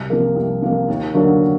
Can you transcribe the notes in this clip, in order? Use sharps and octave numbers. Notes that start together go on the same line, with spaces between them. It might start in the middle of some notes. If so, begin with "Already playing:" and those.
Already playing: C2
C3 F3 A#3
C2
C3 F3 A#3
D#2
D3 F#3 A#3